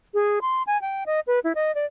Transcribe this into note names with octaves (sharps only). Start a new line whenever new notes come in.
G#4
C6
G#5
G5
D#5
B4
E4
D#5
D5